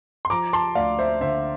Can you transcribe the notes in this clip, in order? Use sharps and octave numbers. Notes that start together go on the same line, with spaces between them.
C6
F3 A#5 D6
A5 C6
D2 D5 F5
C5 E5
D3 C5 E5